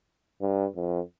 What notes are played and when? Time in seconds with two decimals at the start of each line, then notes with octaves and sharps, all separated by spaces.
0.41 G2
0.75 F2